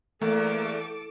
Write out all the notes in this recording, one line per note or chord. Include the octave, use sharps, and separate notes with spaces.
E2 A3 A#3 A4 D6